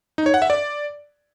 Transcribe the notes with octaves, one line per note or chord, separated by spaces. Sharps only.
D#4
C#5
F#5
E5
D5